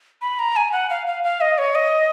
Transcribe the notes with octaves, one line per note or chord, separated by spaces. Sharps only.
B5
A#5
G#5
F#5
F5
F5
F5
D#5
C#5
D#5